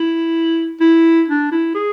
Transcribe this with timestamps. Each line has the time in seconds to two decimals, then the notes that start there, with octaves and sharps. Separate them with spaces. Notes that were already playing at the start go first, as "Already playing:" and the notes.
Already playing: E4
0.81 E4
1.28 D4
1.52 E4
1.75 G#4